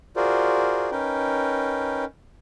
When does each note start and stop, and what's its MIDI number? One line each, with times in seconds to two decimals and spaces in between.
0.16 0.90 65
0.16 0.90 66
0.16 0.90 68
0.16 0.90 70
0.16 0.90 72
0.16 0.90 74
0.91 2.04 61
0.91 2.04 63
0.91 2.04 70
0.91 2.04 71
0.91 2.04 79